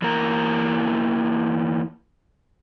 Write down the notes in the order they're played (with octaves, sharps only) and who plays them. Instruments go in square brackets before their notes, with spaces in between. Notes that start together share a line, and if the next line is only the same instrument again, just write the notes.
[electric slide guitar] E2 E3 A#3 A#4 A5 A#5